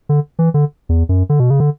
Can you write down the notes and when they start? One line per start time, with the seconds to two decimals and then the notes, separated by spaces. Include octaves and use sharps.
0.09 D3
0.39 E3
0.54 D3
0.89 E2
1.09 F#2
1.29 D3
1.40 B2
1.50 C#3
1.60 D3